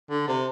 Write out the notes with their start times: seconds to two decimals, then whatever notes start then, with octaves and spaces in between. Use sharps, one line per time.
0.10 D3
0.28 C3